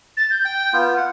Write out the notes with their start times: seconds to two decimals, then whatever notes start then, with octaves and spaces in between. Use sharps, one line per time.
0.17 A6
0.31 G6
0.45 G5
0.73 B3 F4
0.97 F#5